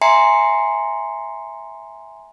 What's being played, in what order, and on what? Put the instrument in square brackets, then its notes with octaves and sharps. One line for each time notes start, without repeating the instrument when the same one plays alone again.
[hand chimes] E5 G#5 A#5 C6 C7 C#7